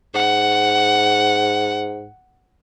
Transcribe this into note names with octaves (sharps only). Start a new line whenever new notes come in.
G#2 F#5